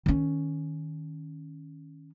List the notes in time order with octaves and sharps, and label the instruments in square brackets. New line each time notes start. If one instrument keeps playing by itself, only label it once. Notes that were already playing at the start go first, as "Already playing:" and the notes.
[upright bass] D#3 C#4